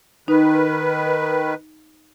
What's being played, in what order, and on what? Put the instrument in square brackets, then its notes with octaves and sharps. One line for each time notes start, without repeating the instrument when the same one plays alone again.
[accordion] D#3 B4 [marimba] D#4